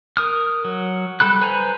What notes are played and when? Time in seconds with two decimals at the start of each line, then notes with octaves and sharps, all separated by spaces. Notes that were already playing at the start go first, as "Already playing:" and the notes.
0.17 A#4 D#6 F6
0.65 F#3
1.20 G3 A4 B5 F#6
1.41 B4 C5 G#5 A#5 B5